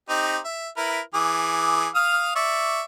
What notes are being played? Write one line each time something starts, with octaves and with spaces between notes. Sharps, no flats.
C4 D#4 G4
E5
E4 A#4 B4
E3 G#4 D6
F5 D#6 F6
D5 E5 C#6